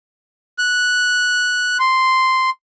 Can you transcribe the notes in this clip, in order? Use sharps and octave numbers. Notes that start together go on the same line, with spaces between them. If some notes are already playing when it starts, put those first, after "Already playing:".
F#6
C6